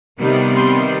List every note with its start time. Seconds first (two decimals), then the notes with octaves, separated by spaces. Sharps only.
0.19 C3 D#3 G3 B3
0.56 C6